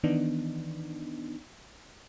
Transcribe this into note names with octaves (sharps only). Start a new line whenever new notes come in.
D#3 E3 B3 D4 D#4